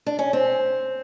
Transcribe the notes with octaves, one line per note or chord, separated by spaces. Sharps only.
D4
C#4
C4